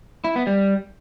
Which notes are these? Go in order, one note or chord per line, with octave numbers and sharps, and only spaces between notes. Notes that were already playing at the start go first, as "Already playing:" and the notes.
E4
B3
G3